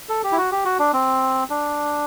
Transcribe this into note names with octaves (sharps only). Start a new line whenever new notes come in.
A4
G4
E4
F#4
G4
F#4
D4
C4
D4